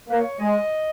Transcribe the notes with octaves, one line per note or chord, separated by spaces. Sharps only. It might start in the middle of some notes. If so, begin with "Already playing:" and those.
A#3 B4
C#5
G#3 D#5